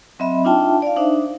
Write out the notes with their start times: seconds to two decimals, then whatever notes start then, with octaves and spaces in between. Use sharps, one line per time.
0.19 F#3 C4 D#5 E5 B5
0.45 D4 D#4 F4 E5 G5 A5
0.82 D5 F5
0.96 D4 D#4 C5 E5